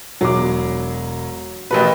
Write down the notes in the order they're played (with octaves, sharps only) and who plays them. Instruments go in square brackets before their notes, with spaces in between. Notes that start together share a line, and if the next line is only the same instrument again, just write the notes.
[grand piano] E1 D6 [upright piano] F#3
[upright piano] A1 B2 B4 [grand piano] A#4